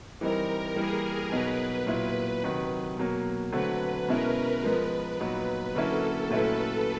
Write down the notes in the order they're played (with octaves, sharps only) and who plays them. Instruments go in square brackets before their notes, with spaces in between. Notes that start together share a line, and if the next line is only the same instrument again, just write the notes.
[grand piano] E3 G3 C4 D#4 [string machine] A#4
[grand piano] E3 G3 A#3 [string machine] G#4
[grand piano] B2 F#3 B3 D#4 [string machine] B4
[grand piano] A#2 F#3 B3 E4
C3 D#3 F#3
B2 F#3 A#3
[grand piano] D3 F#3 A3 C4 [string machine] B4
[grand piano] B2 G#3 C#4 E4 [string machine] A#4
[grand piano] F3 G#3 B3 [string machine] B4
[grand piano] A#2 F#3 B3 D#4
[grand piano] D3 F#3 A#3 C#4 E4 [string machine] A4
[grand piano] A#2 F#3 A3 C#4 E4 [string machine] B4